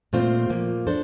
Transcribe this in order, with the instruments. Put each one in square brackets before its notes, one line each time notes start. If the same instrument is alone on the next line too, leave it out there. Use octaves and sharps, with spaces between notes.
[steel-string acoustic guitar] A#2 A3 C4 F4 C5
A#2 F3 A#3
D4 A4 C5